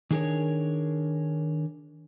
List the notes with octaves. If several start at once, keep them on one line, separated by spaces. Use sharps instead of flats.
D#3 D4 G#4 A#4 C#5